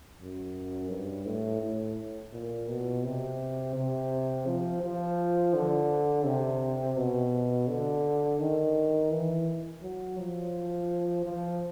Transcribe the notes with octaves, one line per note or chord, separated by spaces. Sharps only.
F#2
G2
A2
A2
A#2
B2
C3
C3
F3
F3
D3
C3
B2
D3
D#3
E3
F#3
F3
F3